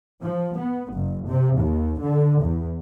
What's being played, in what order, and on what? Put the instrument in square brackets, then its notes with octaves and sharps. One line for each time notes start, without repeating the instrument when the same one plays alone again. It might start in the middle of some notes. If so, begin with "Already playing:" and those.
[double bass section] F3
B3
F#1
C3
D#2
D3
E2